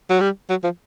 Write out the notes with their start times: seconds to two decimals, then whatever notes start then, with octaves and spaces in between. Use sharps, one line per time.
0.10 F#3
0.20 G3
0.50 F#3
0.64 F3